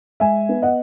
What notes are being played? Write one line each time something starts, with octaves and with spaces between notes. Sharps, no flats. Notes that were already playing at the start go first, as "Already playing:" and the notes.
G#3 E5 G#5
B3
D#5 F#5